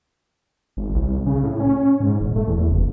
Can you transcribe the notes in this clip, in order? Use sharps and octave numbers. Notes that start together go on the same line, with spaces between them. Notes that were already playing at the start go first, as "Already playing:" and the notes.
G#1
C2
C#3
A2
C#4
G#2
D#1
A3
E2
F#1